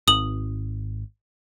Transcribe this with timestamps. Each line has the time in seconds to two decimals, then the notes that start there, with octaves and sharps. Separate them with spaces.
0.08 G#1 D#6 F#7